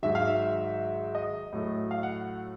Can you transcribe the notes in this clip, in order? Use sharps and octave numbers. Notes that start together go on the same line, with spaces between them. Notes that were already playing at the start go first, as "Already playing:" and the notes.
G#2 D#3 F#3 E5
F5
E5
D#5
A2 F#3 A3
F5
F#5